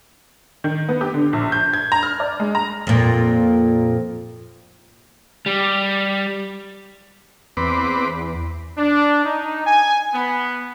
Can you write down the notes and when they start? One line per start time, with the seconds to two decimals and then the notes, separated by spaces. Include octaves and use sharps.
0.64 D#3
0.89 B3
1.01 G4
1.14 D3
1.33 A#1
1.52 G6
1.74 G#6
1.92 A#5
2.03 F6
2.20 D5
2.40 G#3
2.55 A#5
2.87 F2 A#2
5.46 G3
7.57 E2 C4 B4 D6
8.78 D4
9.25 D#4
9.67 G#5
10.14 B3